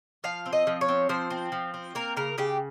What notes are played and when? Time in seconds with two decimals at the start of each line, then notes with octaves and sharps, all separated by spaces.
0.24 F3 F5
0.46 C4
0.53 D#5
0.67 F3
0.81 C#5
0.88 C4
1.09 F3 C5
1.30 C4
1.52 F3
1.74 C4
1.95 A#3 A#4
2.17 C#3 A#4
2.38 C#3 G4